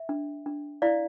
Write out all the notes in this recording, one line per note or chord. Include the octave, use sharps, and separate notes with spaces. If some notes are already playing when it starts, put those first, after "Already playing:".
Already playing: E5
D4
D4
E4 D5 F5